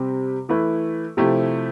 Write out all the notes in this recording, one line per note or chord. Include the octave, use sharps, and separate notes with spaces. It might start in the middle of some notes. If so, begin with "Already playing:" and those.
Already playing: C3 G3 C4 G4
E3 A3 E4 B4
C3 F3 A3 E4 G4